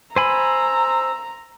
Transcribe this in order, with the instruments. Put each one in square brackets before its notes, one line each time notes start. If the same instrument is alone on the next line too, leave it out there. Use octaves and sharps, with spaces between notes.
[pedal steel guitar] C5 G#5 B5 [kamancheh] A#5 [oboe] E6